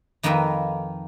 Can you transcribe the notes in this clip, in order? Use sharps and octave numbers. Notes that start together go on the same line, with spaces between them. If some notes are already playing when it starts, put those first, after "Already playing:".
F2 D#3 A#3 A4 B4 D#5